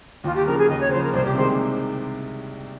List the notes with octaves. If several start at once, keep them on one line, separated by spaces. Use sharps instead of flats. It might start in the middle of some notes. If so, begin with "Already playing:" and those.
D#2 F4
G4
C#3 F3 A#4
G#4
D#2 D#5
C#5
C#3 F3 C5
A#4
C2 C5
G4
C3 D#3 G#3 C5